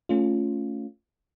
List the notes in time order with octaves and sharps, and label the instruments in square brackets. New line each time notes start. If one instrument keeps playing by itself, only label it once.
[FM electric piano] A3 C#4 F4